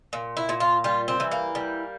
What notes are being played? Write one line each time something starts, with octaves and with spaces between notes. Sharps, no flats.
A#2
E4
A#2
F4
G3 F4
C4
E3
A#3
G3